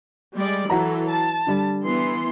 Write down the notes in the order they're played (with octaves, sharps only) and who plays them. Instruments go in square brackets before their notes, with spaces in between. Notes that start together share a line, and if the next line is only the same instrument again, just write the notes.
[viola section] G3 G#3 D5
[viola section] E3 F#3 A4 [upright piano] E4 F#4 A#5
[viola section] A5
[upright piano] D3 G3
[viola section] E3 B3 C6